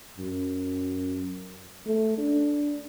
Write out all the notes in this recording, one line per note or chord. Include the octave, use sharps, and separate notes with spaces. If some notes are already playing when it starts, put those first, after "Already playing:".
F#2
A3
D4